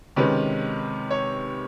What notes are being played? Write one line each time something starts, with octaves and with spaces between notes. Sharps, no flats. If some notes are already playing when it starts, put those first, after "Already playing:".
C3 D#3 G#3 C#4 B4
C#5